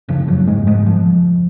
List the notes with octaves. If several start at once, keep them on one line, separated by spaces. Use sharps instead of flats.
F#1 F2 C#3 F3
F#2 F#3
G#2 G#3
G#2 G#3
F3